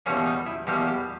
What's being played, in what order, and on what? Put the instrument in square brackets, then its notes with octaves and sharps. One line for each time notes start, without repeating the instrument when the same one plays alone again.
[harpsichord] E2 B2 G3 A#3 C#4
D#4
E4
E2 B2 G3 A#3 G4
G4